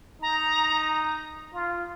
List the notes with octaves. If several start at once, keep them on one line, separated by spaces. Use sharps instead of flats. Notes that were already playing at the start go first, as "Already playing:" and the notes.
D#4 A#5
F4